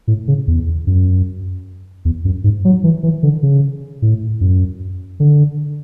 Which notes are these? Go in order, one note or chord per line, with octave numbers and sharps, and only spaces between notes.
A2
C#3
E2
F#2
E2
F#2
G#2
F#3
E3
E3
D3
C#3
A2
F#2
D3